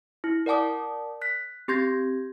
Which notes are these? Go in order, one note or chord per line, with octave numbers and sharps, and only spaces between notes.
E4
A#4 D5 F#5 A5 D6 D#6
F#6 B6
C4 G4 C6 G6 G#6 A#6